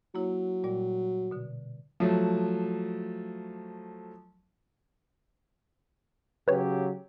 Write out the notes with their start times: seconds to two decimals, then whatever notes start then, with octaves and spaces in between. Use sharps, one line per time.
0.15 F#3 A#3 E4 C#5
0.64 A#2 G3 D5
1.31 B2 D3
2.00 F3 F#3 A3
6.48 C#3 F#3 G4 B4 C#5